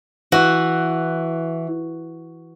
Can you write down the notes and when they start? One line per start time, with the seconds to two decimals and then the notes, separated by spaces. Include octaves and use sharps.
0.32 E3 F#4